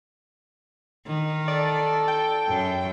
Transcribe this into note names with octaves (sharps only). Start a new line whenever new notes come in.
D#3
A4 D5
G5
F#2